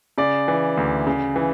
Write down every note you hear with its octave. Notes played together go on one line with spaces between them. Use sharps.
C#3 D5
E3
D2
C#3
E3